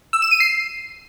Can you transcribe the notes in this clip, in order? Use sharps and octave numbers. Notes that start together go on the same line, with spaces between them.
E6
E7
D#7
C7